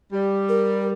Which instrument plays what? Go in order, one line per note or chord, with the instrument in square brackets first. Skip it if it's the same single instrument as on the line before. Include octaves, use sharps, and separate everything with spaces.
[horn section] G3
[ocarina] A#4